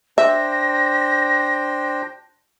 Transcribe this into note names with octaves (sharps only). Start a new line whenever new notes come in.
D4 C5 E5 G5 A#6